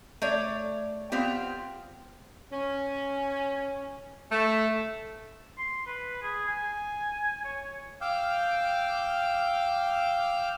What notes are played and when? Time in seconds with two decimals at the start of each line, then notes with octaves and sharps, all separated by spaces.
0.22 A3 C#5 D5
1.12 B3 C4 F4 G4
2.52 C#4
4.31 A3
5.58 C6
5.86 B4
6.23 G#4
6.48 G#5
7.45 C#5
8.01 F5 G5 D6 E6 F6 G6